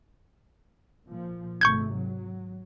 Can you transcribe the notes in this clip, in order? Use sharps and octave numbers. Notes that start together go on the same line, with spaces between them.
A#2 F3
G#1 C3 A3 C#6 G6 G#6
F#3